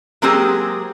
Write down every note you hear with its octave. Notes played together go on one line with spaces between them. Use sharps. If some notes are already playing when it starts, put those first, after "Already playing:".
F#3 G#3 A#3 C4 G4 G#4